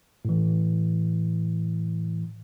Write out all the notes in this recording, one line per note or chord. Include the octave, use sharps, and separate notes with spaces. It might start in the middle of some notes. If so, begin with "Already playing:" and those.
A2 E3